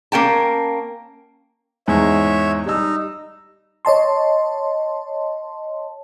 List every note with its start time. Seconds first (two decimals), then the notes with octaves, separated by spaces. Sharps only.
0.12 A#3 C#4 G5 A5
1.88 E2 G#2 G#3 C#5 E5
2.66 G3 D#4 E6
3.85 C#5 D#5 A5 C6